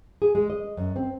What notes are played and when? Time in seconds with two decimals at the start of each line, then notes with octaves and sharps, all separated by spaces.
0.22 G#4
0.35 G#3
0.50 D#5
0.77 F#2
0.96 C4